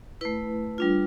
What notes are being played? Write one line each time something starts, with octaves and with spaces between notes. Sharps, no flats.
A3 E4 B4
G3 D4 F4